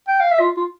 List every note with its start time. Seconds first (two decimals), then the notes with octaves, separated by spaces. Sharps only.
0.08 G5
0.20 F5
0.32 E5
0.40 F4
0.57 F4